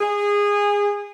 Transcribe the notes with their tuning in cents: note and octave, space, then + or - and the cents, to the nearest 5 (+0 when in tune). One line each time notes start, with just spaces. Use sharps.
G#4 -20